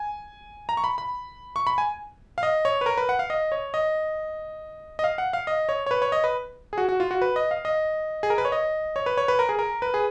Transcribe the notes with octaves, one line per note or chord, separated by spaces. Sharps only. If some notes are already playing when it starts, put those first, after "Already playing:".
Already playing: G#5
A#5
C#6
B5
B5
C#6
B5
G#5
F5
D#5
C#5
B4
A#4
B4
F#5
F5
D#5
C#5
D#5
D#5
F5
F#5
F5
D#5
C#5
C#5
B4
C#5
D#5
B4
G#4
F#4
F#4
F4
F#4
B4
D#5
F5
D#5
G#4
A#4
B4
C#5
D#5
C#5
B4
C#5
B4
A#4
G#4
A#4
B4
G#4